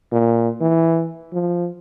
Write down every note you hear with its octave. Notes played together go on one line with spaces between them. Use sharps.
A#2
E3
F3